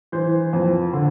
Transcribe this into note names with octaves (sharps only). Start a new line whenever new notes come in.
E3 C5
F2
D3